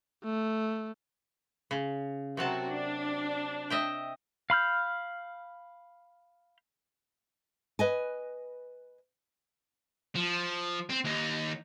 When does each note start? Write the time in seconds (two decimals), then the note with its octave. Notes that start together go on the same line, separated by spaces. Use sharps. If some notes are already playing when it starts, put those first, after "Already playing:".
0.24 A3
1.71 C#3
2.37 C3 F#3 C4 F#4 A#4 A5
2.70 D4
3.70 D#5 E5 G5
4.50 F5 B5 F6 G6
7.79 B4 D#5 G#5
10.15 F3
10.89 C4
11.04 D#2 D#4